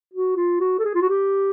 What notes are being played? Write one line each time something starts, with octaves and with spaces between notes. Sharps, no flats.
F#4
F4
F#4
A4
G#4
F4
F#4
G4